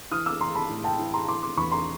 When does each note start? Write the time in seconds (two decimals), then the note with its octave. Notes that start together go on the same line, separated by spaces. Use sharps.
0.11 E3 D#6 F6
0.26 D6 E6
0.41 E3 A#5 C6
0.55 A5 B5
0.69 A2
0.84 G5 A5
0.99 E3
1.14 A#5 C6
1.28 E3 C6 D6
1.43 C6 D6
1.57 E2 B5 C#6
1.72 A#5 C6